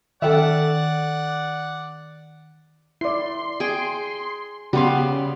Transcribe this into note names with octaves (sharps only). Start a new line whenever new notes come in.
D#3 C#4 A4 D5 E5 F#5 G5
E4 D5 C6
G#4 G5
C#3 G3 B3 F#4 F5 C6